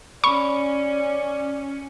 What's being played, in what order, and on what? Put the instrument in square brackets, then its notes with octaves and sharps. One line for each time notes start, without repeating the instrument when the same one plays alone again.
[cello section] C#4 [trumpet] D5 [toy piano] B5 [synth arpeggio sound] C#6